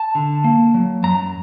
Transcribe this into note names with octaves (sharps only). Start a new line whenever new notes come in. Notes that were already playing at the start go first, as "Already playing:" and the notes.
Already playing: A5
D3
A#3
F#3
F#2 A#5